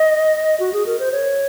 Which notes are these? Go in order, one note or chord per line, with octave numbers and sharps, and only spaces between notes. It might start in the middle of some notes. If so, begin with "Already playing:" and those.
Already playing: D#5
F#4
G#4
A#4
C5
C#5